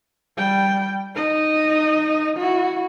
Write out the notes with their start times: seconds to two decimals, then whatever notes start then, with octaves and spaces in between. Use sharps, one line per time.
0.37 G3 G5
1.15 D#4 D#5
2.37 E4 F#4